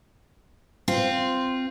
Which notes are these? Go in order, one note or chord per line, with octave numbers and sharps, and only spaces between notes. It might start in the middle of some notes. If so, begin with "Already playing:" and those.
C4 F4